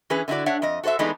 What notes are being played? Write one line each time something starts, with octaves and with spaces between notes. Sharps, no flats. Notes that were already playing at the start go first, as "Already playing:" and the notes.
E3 C#4 G#4 B4
D3 D#4 E4 F#4 D5
D4 C#5 E5 F#5
F2 D#5
F#4 A4 C5 C#5 E5
E3 G#3 A3 B3 D4 D#4